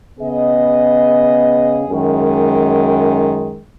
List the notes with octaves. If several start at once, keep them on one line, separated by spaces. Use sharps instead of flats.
C#3 B3 G#4 D#5
F#2 D#3 G#3